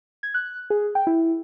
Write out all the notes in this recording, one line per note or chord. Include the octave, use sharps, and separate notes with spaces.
G#6
F#6
G#4
G5
E4